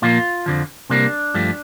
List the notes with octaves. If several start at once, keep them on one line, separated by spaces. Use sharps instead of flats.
A#2 F3 A#3 F4
F2 D3 F3
C3 G3 A#3 D4
G2 F3 A3